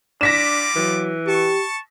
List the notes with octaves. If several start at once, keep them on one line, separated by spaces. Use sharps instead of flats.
G3 D4 F4 D6 A#6 B6 E7
E3 F#3
G4 A5 C#6